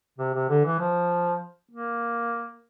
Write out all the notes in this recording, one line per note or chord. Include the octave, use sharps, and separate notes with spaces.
C3
C3
D3
E3
F3
A#3